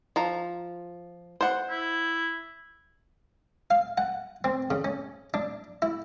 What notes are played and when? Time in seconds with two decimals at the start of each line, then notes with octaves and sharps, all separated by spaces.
0.16 F3 A#5
1.41 C5 F#5
1.71 E4
3.71 F5
3.98 F#5
4.44 C4
4.71 C#3
4.85 C#4
5.34 D4
5.82 E4